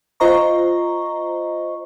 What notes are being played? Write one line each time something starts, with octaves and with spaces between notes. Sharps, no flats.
F4 C5 D#5 A#5 C#6